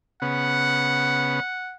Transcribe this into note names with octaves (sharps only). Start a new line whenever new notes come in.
C#3 B3 F#5